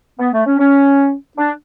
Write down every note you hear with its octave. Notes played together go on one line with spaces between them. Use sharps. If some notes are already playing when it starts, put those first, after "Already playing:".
B3
A3
C#4
C#4
D4